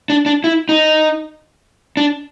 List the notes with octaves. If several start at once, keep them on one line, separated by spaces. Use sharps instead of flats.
D4
D4
E4
D#4
D4